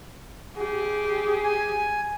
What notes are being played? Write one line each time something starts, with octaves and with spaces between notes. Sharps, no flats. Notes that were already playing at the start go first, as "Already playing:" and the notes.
G4 G#4
G#5